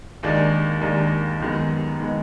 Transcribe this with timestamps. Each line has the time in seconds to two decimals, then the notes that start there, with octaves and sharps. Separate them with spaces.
0.23 D#2 D#3 G#3 D4
0.81 D#2 D#3 G#3 D4
1.40 F#2 D#3 G#3 B3
2.00 D#3 G#3 B3